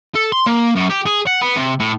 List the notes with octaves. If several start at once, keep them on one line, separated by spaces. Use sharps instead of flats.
A4
C6
A#3
F#2
G4
G#4
F#5
B3
C3
A2